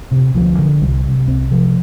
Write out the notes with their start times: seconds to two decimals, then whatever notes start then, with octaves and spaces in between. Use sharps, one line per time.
0.11 C3
0.35 D2 F3
0.59 D3
0.82 C2 G3
1.04 C3
1.27 C2 C4
1.51 C3 F3